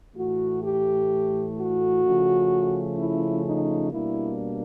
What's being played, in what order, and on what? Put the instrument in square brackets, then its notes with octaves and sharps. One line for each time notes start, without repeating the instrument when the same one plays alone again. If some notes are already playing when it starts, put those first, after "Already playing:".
[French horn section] A2 E3 A3 F#4
G4
F#4
C#3 F3 A3 C#4
E4
D#4
B2 G3 A#3 D4 E4